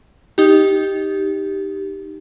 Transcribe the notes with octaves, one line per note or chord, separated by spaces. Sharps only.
D#4 G4